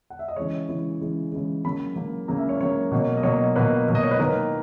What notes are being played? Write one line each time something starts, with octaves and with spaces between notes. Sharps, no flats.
F#5
E5
D#5
C#3 E3 G#3 C#5
C#3 E3 G#3
C#3 E3 G#3
C#3 E3 G#3
C#3 F#3 A#3 B5
C#3 F#3 A#3
C#3 F#3 A#3 A#5
E5
C#5
C#3 F#3 A#3 C#5
B2 F#3 A#3
D#5
B2 F#3 A#3 C#5
B2 F#3 A#3 B4
B2 F#3 A#3
D#5
C#5
B4
D#3 A#3 A#4